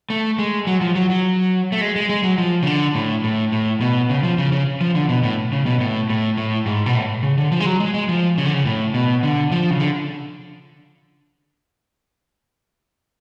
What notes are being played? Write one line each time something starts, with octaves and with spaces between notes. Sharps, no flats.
A3
G#3
F#3
F3
F#3
F#3
A3
G#3
G#3
G#3
F#3
F3
C#3
D3
A2
A2
A2
B2
C#3
F3
C#3
C#3
F3
D3
B2
A2
C#3
B2
A2
A2
A2
G#2
B2
A2
C#3
D3
F3
G#3
F#3
G#3
G#3
F3
C#3
D3
C#3
A2
B2
D3
F3
C#3
D3